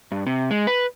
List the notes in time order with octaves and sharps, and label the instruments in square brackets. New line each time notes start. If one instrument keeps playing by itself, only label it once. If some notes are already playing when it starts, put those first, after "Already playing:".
[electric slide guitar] G2
C3
G#3
B4